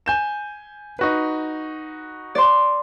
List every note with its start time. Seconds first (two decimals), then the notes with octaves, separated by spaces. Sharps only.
0.06 G#5 G6 E7
0.99 D#4 F#4 B4
2.35 D5 C6